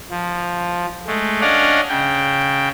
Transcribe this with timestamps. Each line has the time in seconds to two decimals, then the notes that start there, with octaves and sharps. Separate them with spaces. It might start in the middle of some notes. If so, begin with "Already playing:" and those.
0.10 F3
1.07 G#3 A3
1.41 C#4 D4 D5 D#5 F5 F#5
1.89 C#3 G5